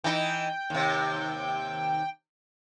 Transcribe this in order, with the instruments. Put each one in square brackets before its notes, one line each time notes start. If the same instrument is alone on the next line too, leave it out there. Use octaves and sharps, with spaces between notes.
[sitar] E3 D#4 [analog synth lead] G5
[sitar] D#2 C3